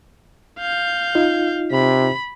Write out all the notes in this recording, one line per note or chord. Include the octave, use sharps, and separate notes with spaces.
F5 G6
D#4 F4
C3 B5